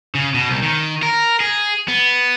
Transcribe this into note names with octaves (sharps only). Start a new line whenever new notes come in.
C#3
B2
C2
D#3
A#4
G#4
B3